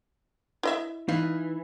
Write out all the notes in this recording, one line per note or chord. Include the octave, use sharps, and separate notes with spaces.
E4 D#5 E5
E3 D#4 F5